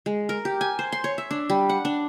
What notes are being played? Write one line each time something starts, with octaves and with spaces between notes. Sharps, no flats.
G#3
A#4
G4
G#5
C5
C6
C#5
E5
D4
G3
F#5
D4